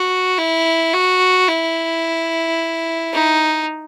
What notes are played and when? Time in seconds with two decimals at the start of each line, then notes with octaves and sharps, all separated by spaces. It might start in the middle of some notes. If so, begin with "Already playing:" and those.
Already playing: F#4
0.38 E4
0.93 F#4
1.48 E4
3.13 D#4